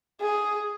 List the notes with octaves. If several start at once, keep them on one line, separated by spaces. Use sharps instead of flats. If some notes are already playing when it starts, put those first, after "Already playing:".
G#4